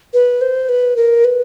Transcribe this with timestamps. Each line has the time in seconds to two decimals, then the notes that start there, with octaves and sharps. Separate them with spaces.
0.14 B4
0.41 C5
0.69 B4
0.96 A#4
1.25 B4